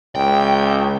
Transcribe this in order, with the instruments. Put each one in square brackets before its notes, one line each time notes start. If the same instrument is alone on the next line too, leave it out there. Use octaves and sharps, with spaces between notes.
[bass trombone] C#2 [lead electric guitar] G5